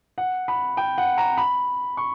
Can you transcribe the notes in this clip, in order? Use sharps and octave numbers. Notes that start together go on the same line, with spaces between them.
F#5
B5
G5
F#5
A#5
B5
C#6